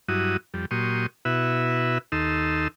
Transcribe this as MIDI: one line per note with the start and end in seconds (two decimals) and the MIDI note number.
0.08 0.37 43
0.08 0.37 54
0.08 0.37 64
0.08 0.37 66
0.08 0.37 87
0.54 0.66 41
0.54 0.66 55
0.71 1.06 46
0.71 1.06 54
0.71 1.06 67
0.71 1.06 84
0.71 1.06 85
0.71 1.06 87
1.25 1.98 47
1.25 1.98 64
1.25 1.98 66
1.25 1.98 71
1.25 1.98 76
2.12 2.68 39
2.12 2.68 63
2.12 2.68 69
2.12 2.68 84
2.12 2.68 88